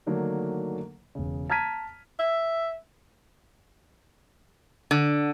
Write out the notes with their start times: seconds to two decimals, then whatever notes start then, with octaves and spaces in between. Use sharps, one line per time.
0.07 D3 D#3 F#3 A3 A#3 D4
1.15 E1 C#3
1.50 A5 A#5 F6 G#6 B6 D#7
2.19 E5
4.91 D3